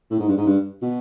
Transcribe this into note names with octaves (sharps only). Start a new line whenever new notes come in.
A2
G#2
G2
G#2
G2
B2